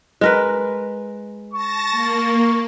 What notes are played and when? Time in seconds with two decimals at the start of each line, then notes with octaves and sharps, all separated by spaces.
0.21 G#3 A#4 B4
1.53 A5 C#6 A6 A#6
1.91 A#3